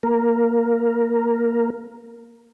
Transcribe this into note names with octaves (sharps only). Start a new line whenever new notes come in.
A#3 A#4